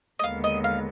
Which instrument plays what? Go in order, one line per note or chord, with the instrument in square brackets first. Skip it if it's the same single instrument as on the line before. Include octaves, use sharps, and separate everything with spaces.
[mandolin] D#5
[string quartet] D#2 D3 G#3 B3 [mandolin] F5
[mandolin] D#5
F5